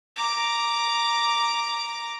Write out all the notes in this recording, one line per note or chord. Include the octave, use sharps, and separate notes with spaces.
A#5 D6